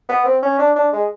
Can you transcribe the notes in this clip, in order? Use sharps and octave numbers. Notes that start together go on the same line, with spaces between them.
B3
C4
C#4
D4
D4
G#3